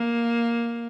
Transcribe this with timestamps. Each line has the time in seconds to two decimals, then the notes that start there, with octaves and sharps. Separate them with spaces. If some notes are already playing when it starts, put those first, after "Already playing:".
Already playing: A#3